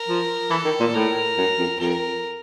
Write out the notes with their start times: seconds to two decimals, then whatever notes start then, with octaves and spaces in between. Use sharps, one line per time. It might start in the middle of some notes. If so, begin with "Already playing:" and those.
Already playing: A#4
0.08 F3
0.50 E3 A4
0.65 D#3
0.80 A#2
0.94 A2 A#4
1.38 F#2
1.58 F2
1.80 F2 A#4